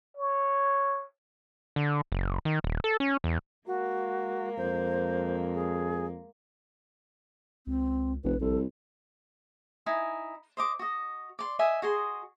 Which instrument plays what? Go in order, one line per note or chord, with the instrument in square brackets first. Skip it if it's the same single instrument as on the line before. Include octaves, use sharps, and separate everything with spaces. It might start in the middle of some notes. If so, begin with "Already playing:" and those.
[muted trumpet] C#5
[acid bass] D3
F#1
D#3
D#1
A4
C#4
E2
[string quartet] G#3 A#3 [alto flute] F#4
[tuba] F2 [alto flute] C5
[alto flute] G#4
[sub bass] C#2 [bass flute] C4
[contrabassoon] F1 [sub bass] A#1 [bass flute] B4
[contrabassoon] C2 [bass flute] A4
[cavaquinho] D#4 E4 G#5
C5 D#5 D6
F#4 D#5
D5 C6
D#5 E5 G#5
F#4 G#4 D#5 C6